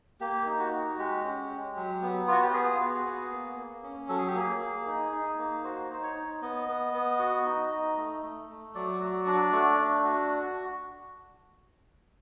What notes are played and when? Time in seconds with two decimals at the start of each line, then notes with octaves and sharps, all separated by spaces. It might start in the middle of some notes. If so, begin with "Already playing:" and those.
0.20 A#3 G4
0.46 D#4
0.59 F#4
0.73 F#4
0.98 G#3 G4
1.24 C#4
1.50 G#3
1.76 F#3
2.02 B3
2.28 F4 F#4
2.42 G4
2.54 B3 G#4
2.80 F#4
3.05 B3
3.31 A#3
3.57 A#3
3.83 C#4
4.09 F#3 A4
4.18 G#4
4.28 G4
4.35 A#3 G#4
4.61 A#3
4.87 D#4
5.12 D#4
5.38 A#3
5.64 F#4 C5
5.90 D#4 C5
6.03 C#5
6.16 D#4
6.42 B3 D#5
6.68 B3
6.94 B3
7.19 F#4
7.45 D#4
7.71 D#4
7.97 A3
8.23 A3
8.49 A3
8.75 F#3 D5
9.01 F#4
9.26 D4
9.52 A3
9.78 D4
10.04 F#4